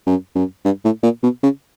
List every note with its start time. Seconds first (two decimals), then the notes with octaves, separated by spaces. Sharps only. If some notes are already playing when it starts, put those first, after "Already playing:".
0.06 F#2
0.35 F#2
0.65 G2
0.84 A2
1.03 A#2
1.23 B2
1.43 C#3